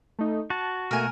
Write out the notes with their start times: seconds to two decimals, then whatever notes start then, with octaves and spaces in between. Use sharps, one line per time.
0.19 A3 D#4
0.50 F#4 A5
0.91 B2 A3 A#3 A#4 G#5